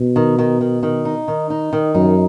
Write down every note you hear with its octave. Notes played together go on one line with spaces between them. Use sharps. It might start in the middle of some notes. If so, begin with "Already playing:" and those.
Already playing: B2
D#3
D#3
D#3
D#3
D#4
D#3
D#4
D#3
F#2 D#4